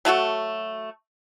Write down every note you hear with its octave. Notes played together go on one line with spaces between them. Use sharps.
F#3 A3 F#4 A4